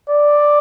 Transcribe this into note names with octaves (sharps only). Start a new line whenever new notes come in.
D5